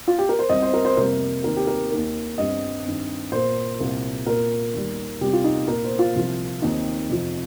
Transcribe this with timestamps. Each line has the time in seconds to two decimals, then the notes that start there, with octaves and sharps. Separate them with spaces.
0.07 F4
0.19 G4
0.29 A#4
0.39 C5
0.49 C2 C3 G3 D#5
0.62 C5
0.74 A#4
0.85 C5
0.97 F2 C3 G3 A#3 A#4
1.44 D#2 D#3 C4 A#4
1.57 G4
1.67 A#4
1.91 D#2 D#3 A#3
2.38 G2 G3 C4 D#5
2.85 G2 D#3 C4
3.32 A#2 A#3 C5
3.80 C2 A#2 A#3
4.26 A#2 A#3 A#4
4.74 D#2 D#3 G3
5.21 C2 C3 G3 G4
5.33 F4
5.44 D#4
5.68 A#2 A#3 A#4
5.84 C5
5.99 F4
6.15 C2 C3 F3
6.62 D#2 D#3 C4 D#4
7.10 F2 C3 F3